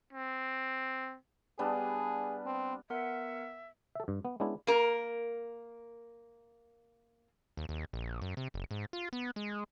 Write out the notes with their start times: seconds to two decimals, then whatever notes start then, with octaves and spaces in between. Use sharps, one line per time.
0.13 C4
1.59 G3 B3 D4 G#4
2.46 C4
2.90 B3 A#4 E5 F#5
3.95 A4 E5
4.08 G2
4.25 B3
4.40 G#3 B3 C#4 D4 E4
4.67 A#3 A#4
7.57 D#2
7.69 D#2
7.93 A#1
8.22 F#2
8.37 C3
8.54 F#1
8.71 G#2
8.93 F4
9.13 B3
9.36 G#3